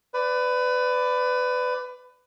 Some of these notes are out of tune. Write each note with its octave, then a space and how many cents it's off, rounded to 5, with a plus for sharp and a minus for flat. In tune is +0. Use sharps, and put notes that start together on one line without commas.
B4 +25 D5 +0